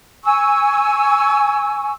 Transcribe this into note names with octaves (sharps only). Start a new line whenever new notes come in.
G#5 C#6 E6